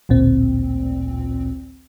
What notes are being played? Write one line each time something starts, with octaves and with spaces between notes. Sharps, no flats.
A1 D2 A#2 C4